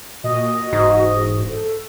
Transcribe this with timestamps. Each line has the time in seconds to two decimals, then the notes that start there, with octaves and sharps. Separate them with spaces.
0.24 A#2 F#4 D#5
0.73 E1 G#2
1.48 A4